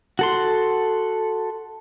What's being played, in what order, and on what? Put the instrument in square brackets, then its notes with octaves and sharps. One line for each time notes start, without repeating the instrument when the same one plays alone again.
[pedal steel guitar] F#4 A4 C6